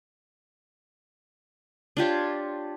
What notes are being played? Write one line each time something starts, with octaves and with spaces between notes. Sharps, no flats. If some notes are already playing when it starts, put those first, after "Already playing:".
D4 F4 G4 C#5